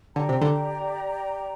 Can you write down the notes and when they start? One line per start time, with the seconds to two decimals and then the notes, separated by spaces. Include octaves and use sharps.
0.16 D3 G4 D5 G5 A#5
0.29 C3
0.42 D3